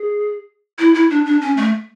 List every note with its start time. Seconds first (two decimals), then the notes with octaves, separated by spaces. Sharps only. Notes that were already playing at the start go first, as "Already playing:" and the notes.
Already playing: G#4
0.79 E4
0.95 E4
1.10 D4
1.26 D4
1.41 C#4
1.57 A3